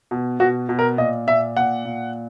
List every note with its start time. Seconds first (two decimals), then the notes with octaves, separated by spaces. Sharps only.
0.11 B2
0.40 B2 F#4
0.69 B2
0.79 A#4
0.98 A#2 D#5
1.27 A#2 E5
1.57 A#2 F#5
1.85 A#2